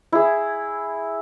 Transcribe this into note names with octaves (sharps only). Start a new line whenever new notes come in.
E4 G#4